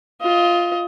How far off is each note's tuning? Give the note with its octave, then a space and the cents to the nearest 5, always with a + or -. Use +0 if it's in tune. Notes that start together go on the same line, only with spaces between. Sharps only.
F4 +0 D#5 +25